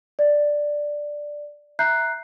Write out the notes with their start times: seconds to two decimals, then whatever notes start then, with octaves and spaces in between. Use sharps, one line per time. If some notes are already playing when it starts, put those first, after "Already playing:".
0.19 D5
1.79 E5 A#5 F#6 G6 C7